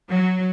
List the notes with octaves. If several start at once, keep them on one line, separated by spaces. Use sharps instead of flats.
F#3